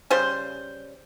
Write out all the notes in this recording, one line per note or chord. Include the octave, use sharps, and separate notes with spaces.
C#3 G3 C5